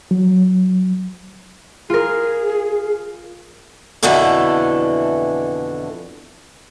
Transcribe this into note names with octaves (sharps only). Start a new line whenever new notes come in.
F#3
F4 G#4 A#4
F2 B2 D3 E3 A3 D4